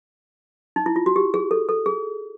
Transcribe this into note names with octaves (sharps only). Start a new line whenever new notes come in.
D#4
E4
F4
F#4
G4
G#4
A4
A4
G#4